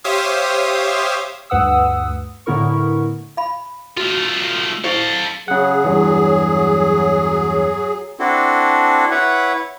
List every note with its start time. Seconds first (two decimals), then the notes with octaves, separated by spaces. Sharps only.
0.04 G4 C5 C#5 E5 F5 D#6
1.50 D2 G2 B4 F#5 D#6 E6
2.46 A2 D3 B3 E4 A#4 C#6
3.37 F5 B5
3.97 A3 F4 F#4
4.84 E4 G4 A4 C5 F5
5.48 C#3 F#3 G#4 F#5
5.85 E2 G2
8.19 C4 D4 E4 F#4 A4
9.11 E4 B4 C#5 E5 F#5